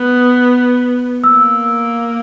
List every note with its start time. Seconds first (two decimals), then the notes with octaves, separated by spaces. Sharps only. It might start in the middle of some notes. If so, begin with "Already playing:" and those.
Already playing: B3
1.24 A#3 E6